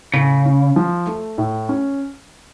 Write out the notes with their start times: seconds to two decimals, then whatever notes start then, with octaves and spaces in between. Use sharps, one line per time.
0.14 A2 C#3
0.45 C#4
0.76 F3
1.07 A3
1.38 A2
1.69 C#4